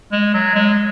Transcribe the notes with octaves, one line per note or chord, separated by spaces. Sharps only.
G#3
F#3
G#3